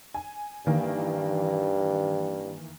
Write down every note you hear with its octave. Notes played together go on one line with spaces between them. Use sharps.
G#5
G2 D#3 E3 A#3